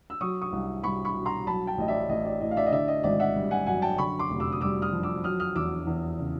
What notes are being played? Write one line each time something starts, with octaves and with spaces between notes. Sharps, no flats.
E6
F#3 C#6 D#6
C#6 D#6
C2
C2 B5 C#6
B5 C#6
B2
A#5 C6
F#3 A5 B5
G5 A5
A1 D#5
D5 E5
A1 D#5
D5
A2 D#5
F5
D5 E5
D#5
D3 D5 E5
D#5
G#1 D5 E5
E5 F#5
G3
F#5 G#5
F#2 F#5 G#5
G5 A5
D3 B5 C#6
C6 D6
F1
D6 E6
D#6
G3 D6 E6
D#6 F6
F2
D6 E6
F#3 D#6 F6
D#6 F6
E2 D6 E6
E2
C#3